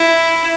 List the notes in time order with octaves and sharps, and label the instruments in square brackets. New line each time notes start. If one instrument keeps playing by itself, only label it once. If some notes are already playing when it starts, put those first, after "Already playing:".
Already playing: [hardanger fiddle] E4